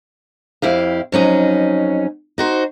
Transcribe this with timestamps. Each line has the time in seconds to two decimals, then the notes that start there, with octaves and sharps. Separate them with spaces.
0.62 F2 E4 G4 F5
1.12 F2 F#3 C#4 D#4
2.38 D#4 F#4 C5